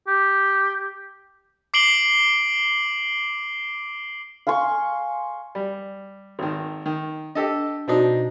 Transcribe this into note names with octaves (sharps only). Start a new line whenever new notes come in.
G4
D6 C7 D7 F#7 G7
F5 G#5 C6 C#6
G3 D5
G#1 D#3
D#3
D4 G4 A4 D#5
B2 C4 D4 D#4 F#4 A5